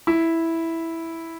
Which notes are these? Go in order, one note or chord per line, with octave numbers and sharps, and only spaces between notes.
E4